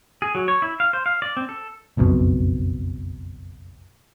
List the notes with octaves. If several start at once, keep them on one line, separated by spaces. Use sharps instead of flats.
G#4
F#3
C#5
E4
F5
C5
F5
D5
C4
A4
F#1 B1 F2 B2